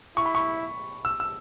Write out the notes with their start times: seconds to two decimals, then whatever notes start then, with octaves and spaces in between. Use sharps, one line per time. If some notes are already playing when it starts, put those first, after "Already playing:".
0.17 E4 C#6
0.26 B5
0.35 C#6
1.05 E6
1.20 E6